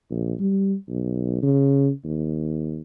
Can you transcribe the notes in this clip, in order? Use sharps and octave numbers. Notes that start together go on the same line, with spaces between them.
A#1
G3
B1
C#3
D#2